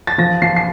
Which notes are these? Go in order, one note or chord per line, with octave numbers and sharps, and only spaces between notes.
A6
F3 A#6
F3 C7
C7